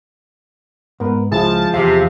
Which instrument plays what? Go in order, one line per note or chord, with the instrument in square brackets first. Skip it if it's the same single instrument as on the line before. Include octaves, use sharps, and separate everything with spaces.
[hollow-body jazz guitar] G#2 [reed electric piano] B3 A#4 B4
[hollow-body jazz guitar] C#2 [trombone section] F3 [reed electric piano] E4 G#4 [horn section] A5
[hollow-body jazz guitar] E2 F5 [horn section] C3